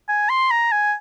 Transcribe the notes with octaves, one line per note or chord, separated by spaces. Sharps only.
G#5
C6
A#5
G#5